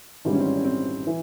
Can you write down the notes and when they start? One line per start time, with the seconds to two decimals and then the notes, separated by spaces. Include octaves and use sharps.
0.25 G#1 G#2 E3 G3 D4
0.32 C#4
0.39 C4
0.46 C#4
0.57 C#4
0.65 C4
1.07 E3